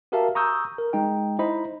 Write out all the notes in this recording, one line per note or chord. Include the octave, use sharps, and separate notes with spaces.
F#4 G4 A#4 E5 F5 A5
A#5 C#6 D#6 E6 G6
A#4
G#3 D#4 G5
D#4 E4 C5 D#5 B5